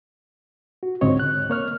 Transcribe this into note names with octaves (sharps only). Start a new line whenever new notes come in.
F#4
C#2 G#2 D3 C4 C#5 D#5
F#6
A#3 C#5 F6